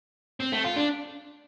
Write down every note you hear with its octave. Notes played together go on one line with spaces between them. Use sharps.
C4
A3
F4
D4